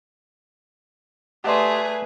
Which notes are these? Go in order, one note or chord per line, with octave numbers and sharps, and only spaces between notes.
A3 G4 G#4 B4 D5 D#5 F#5 C6